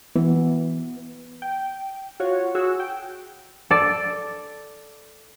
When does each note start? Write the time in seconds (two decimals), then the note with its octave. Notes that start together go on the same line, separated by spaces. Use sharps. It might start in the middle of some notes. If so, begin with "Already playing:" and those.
0.16 E3 B3
1.42 G5
2.20 F4 F#4 C#5
2.55 F#4 G#4 E6
2.80 G5
3.70 A4 D5